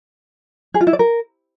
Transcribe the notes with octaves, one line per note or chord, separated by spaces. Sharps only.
G#4
F4
E4
D5
A#4